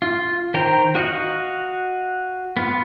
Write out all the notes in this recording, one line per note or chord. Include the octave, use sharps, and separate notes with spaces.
F4
D#3 C5 G5 A#5
F#4 D#5 F5 F#5
B3 F4